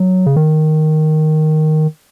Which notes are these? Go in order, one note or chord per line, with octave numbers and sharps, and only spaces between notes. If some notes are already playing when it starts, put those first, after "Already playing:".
Already playing: F#3
C#3
D#3